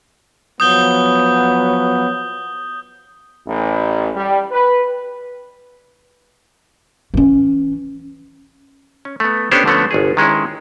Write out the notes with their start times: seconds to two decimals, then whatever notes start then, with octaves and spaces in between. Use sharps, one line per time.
0.60 F3 F#3 B3 D#6 G6 G7
3.46 A1
4.14 G3
4.51 B4
7.14 E3 C#4
9.05 C#4
9.20 A3 B3
9.51 B3 C#4 D4 G4 A4 C5
9.65 D3 F3 A3 B3 C#4
9.91 G1 C2 G#4
10.17 D#3 G#3 C#4 E4